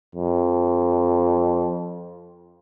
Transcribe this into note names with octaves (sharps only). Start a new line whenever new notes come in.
F2